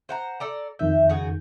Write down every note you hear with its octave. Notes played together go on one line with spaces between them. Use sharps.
C5 F#5 A#5
A4 D5 A#5
F2 D#3 E5 G6
C#3 F#4 G#4